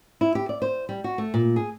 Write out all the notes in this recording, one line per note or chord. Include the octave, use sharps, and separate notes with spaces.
E4
G4
D5
C5
G3
F#4
A3
A#2
G#4